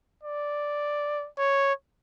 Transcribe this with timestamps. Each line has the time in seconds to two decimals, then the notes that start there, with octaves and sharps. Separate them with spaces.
0.23 D5
1.38 C#5